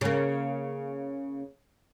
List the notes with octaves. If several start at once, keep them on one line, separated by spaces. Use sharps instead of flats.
C#3 A#3